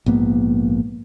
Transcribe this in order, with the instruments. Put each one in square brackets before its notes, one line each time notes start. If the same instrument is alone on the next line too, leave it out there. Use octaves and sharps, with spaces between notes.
[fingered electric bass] A#1 G#2 A#3 B3